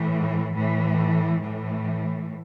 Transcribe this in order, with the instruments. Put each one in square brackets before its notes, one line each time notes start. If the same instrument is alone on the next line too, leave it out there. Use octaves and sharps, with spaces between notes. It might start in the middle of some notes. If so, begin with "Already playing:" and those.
Already playing: [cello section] A2 E3
A2 E3
A2 E3